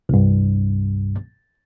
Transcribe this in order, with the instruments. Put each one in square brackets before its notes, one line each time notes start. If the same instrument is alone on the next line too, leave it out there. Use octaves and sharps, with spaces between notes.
[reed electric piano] C2 G2